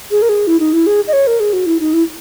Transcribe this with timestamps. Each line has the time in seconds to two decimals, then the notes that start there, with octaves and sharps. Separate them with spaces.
0.11 G#4
0.22 A#4
0.29 G#4
0.47 E4
0.60 D#4
0.73 E4
0.86 G#4
1.08 D#5
1.13 C#5
1.27 A#4
1.40 G#4
1.53 F#4
1.66 E4
1.80 D#4
1.94 E4